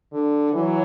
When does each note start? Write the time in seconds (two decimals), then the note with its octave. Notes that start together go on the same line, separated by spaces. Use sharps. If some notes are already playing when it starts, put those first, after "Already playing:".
0.13 D3
0.53 E3 F#3